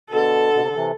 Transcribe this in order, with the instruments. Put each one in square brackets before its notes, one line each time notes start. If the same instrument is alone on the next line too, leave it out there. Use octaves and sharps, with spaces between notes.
[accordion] B2 D3 [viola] A4
[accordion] B2
C3
D3
C3 E3